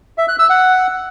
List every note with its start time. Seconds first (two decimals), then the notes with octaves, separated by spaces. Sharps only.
0.18 E5
0.28 F#6
0.39 E6
0.50 F#5